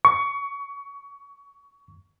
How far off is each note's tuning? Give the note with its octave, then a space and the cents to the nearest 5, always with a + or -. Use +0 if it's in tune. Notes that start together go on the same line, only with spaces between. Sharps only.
C#6 +20